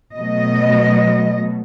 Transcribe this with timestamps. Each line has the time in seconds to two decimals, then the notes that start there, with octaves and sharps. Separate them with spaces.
0.16 B2 F#3 A3 D#5